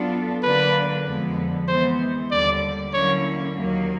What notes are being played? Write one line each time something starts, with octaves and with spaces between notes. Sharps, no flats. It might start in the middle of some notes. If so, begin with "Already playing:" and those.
Already playing: F#3 B3 D4 F4 A4
D3 F#3 A#3 D4 B4
F2 D3 F3 G#3 B3
E3 G#3 B3 C5
D#2 D3 G3 D5
D3 F#3 A#3 C#4 E4 C#5
D#2 D#3 F#3 A#3